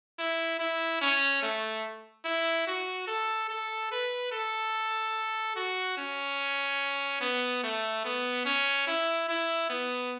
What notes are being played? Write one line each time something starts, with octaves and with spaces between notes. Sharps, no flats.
E4
E4
C#4
A3
E4
F#4
A4
A4
B4
A4
F#4
C#4
B3
A3
B3
C#4
E4
E4
B3